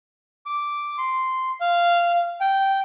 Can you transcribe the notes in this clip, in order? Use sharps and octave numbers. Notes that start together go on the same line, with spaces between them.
D6
C6
F5
G5